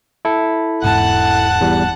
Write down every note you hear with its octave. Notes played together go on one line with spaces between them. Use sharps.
E4 A4
E1 G#2 F#5 A5 F#6
E2 G3